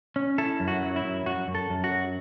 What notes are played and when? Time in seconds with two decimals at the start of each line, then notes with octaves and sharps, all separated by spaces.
0.16 C#4
0.38 E4 A4
0.60 F#2
0.68 F#4
0.83 F#3
0.96 E4
1.04 F#2
1.26 F#2 F#4
1.48 F#2
1.55 A4
1.70 F#2
1.84 F#4
1.92 F#3